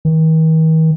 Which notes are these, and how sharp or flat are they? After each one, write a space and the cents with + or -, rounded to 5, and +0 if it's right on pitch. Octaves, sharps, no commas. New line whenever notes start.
D#3 +45